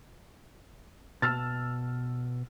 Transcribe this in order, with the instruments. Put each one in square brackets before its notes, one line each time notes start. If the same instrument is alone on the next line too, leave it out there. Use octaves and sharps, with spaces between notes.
[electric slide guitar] B2 C5 A5 [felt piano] E6 F6 A6